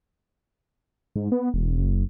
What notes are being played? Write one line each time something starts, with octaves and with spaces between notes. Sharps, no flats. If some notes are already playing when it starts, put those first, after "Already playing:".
G#2
B3
E1
F#1